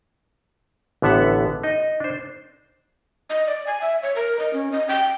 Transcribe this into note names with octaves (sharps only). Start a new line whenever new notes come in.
A1 D3 B3 E5 F#5
D#4 D#5
D4 C5
D#5
D5
G#5
E5
C#5
A#4
D#5
C#4
D#5
G5